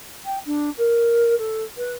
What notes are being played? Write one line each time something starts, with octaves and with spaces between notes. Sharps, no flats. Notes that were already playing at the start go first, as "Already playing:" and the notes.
G5
D4
A#4
A4
B4